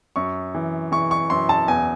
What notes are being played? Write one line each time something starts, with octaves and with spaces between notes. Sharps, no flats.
F#2 C#6
E3
E3 C#6
C#6
F#2 C6
A5
E2 G#5